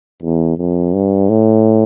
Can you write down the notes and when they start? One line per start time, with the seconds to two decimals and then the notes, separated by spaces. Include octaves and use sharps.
0.22 E2
0.58 F2
0.94 G2
1.29 A2